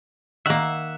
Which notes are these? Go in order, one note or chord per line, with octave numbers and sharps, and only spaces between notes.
D#3 A#3 E5 F#5